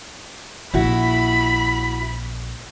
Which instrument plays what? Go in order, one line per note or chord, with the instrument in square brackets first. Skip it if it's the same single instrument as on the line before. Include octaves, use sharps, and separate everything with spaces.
[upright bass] A#1 [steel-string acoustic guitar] E4 F#4 [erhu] B5